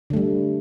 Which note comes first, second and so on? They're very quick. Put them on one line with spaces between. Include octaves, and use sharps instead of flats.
D3 A3 G3